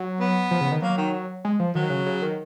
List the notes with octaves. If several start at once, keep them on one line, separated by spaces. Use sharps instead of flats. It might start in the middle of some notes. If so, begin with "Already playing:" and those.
Already playing: F#3
B3
F3
C#3
D#3
F#3 A#3
D#3
G#3
F3
D#3 F#3
C#3
C#3
D#3